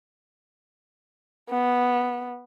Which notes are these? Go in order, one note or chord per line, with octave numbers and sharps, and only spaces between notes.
B3